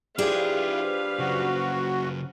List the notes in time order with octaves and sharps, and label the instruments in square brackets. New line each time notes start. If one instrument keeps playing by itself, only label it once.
[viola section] F3 B4 F5 [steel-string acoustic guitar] D4 G4 G#4 [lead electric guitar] E4 F4
[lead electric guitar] F#2 C#3 [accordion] F#4